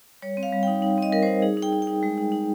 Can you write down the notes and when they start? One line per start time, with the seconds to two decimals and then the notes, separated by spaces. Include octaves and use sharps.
0.22 G3 C#5
0.37 C4
0.43 F5
0.52 G3
0.63 D#4 G5
0.82 D#4
0.98 C4 D#5
1.12 G3 A#4
1.23 D#4 C5
1.42 D#4 G#4
1.57 D#4
1.62 G5
1.72 D#4
1.82 G5
1.87 D#4
2.03 G#3
2.18 D#4
2.32 D#4